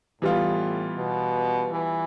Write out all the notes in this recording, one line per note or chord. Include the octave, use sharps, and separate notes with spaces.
A2 E3 G3 B3 F4
B2
E3